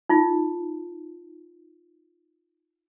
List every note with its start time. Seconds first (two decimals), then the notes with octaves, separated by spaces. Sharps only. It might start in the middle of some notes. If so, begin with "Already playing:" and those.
0.09 D#4 F4